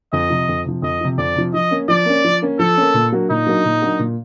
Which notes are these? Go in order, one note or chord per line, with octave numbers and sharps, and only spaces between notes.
F2 D#5
C3 F3
F2
C3 F3
F2 D#5
C3 F3
F2 D5
C3 F3
F3 D#5
A#3 C#4
F3 D5
A#3 C#4
F3
A#3 C#4
F3 A4
A#3 C#4
A#2
F#3 A#3 D4 F#4
A#2 D#4
F#3 A#3 D4 F#4
A#2
F#3 A#3 D4 F#4
A#2